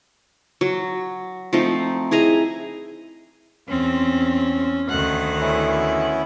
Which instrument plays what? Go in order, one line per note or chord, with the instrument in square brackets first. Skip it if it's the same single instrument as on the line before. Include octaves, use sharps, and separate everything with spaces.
[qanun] F#3
F3 A3 C4 D#4
E4 G#4 D#5 A#5
[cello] E2 C4 [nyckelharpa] C#4
[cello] D2 D#3 [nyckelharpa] F#5
[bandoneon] B3 C#4 E4